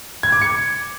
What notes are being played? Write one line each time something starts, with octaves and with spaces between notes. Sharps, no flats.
G#6
D6
C#7